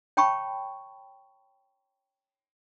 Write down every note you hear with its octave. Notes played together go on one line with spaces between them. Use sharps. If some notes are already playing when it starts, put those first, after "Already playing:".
C#5 G5 A5 B5 C#6